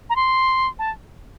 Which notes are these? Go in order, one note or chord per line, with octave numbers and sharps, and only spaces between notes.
A#5
C6
A5